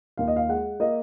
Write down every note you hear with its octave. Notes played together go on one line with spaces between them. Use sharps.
D#2 F5
D#5
F5
G#3 F#5
A#3 D#5